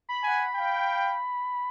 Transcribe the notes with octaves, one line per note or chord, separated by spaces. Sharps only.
B5
F#5 G#5
F5 G5